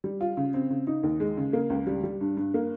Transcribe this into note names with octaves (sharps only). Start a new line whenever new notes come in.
G3
F4
C#3
C4
C#3
D#4
D#2
G#3
C#3
A#3
C#2
G3
G3
G2
G2
A#3